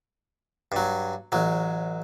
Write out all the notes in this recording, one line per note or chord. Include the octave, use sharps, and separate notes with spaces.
G2 F#3
A1 F#3